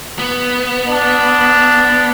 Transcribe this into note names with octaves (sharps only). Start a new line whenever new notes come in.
B3
D4